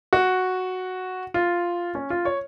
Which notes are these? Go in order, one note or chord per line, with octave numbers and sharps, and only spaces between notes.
F#4
F4
C#4
F4
C#5